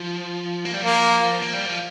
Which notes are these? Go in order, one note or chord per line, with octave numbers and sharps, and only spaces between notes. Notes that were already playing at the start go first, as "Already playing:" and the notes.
Already playing: F3
A#3
G3
F3 A#3
A#3
G3
F3